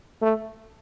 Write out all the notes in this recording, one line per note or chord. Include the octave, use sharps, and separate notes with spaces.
A3